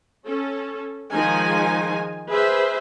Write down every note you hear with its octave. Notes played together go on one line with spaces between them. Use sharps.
C#4 A4
D#3 F3 G#3 D#4 G#5
G#4 B4 C5 E5